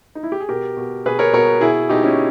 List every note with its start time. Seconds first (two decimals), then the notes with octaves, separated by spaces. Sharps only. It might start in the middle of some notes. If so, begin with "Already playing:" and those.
0.15 D#4
0.23 E4
0.32 G4
0.40 G#4
0.49 B2 G4 A#4
0.77 B2
1.05 B2 G#4 B4
1.19 A#4 C#5
1.33 B2 A#4 C#5
1.61 B2 E4 G#4
1.89 B2 D#4 G4
2.03 C#4 E4